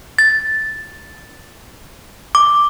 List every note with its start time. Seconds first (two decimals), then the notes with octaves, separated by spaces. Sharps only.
0.19 A6
2.35 D6